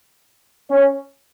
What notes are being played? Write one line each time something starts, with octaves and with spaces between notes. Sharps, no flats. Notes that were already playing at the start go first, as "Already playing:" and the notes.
C#4